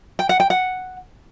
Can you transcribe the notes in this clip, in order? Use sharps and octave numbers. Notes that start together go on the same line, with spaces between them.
G5
F#5
G5
F#5